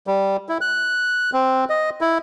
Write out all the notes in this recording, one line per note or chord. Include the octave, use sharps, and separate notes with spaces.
G3
E4
F#6
C4
D#5
E4